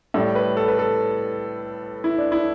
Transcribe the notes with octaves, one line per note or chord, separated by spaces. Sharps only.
A2 G3 A4
B4
A4
B4
A4
E4
D4
E4